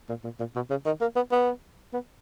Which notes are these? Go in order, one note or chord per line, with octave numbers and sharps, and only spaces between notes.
A#2
A#2
A#2
B2
C#3
D#3
A#3
B3
B3
B3